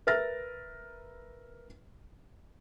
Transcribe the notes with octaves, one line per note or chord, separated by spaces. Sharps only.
A#4 B4 E5 F6 A6 A#6